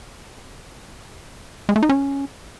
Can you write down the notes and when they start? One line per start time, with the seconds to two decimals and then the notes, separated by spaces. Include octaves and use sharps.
1.69 G#3
1.76 A3
1.83 D#4
1.89 C#4